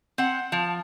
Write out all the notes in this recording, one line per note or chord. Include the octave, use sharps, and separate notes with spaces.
C4 F#5
F3